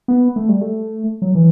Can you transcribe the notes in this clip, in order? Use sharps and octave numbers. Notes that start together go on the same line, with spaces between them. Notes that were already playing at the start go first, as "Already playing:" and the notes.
B3
A3
G3
A3
F#3
E3